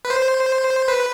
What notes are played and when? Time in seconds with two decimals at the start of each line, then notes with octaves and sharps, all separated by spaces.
0.05 B4
0.10 C5
0.88 B4